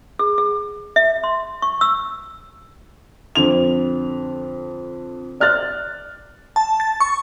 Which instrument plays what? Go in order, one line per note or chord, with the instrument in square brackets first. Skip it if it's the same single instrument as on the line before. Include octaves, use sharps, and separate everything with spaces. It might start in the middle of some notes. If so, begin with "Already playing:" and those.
[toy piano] G#4
G#4
E5
C6
C#6
E6
[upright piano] F2 D3 F7
D5 F6 F#6 A6
[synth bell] A5
A6
C#6